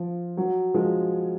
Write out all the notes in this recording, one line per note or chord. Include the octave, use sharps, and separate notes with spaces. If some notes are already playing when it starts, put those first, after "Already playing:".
Already playing: F3
F#3
F3 G#3